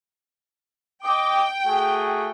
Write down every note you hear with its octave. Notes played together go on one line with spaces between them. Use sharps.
D#5 G5 D6
A3 F#4 G#4